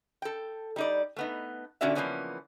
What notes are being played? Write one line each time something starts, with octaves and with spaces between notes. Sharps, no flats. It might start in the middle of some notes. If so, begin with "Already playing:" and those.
A4 G5
G3 D#4 D5
A3 B3 D#4
A#2 D3 C#4 F#4 D5 E5
C#3 E3 F3 A#3 B3 C#4